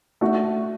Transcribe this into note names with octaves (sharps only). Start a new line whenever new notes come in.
A3 D4 F#4